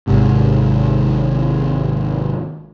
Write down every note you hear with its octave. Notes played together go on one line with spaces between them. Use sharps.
G#1 G#2 C3